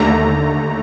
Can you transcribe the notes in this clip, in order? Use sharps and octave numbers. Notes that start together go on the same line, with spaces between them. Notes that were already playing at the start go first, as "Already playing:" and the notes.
Already playing: D#2 D3 A3 A#5